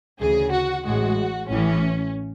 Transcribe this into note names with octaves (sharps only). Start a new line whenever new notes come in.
D2 C#3 E3 G#4
F#4
A1 A2 G#3 F#4
A1 A2 E3 C#4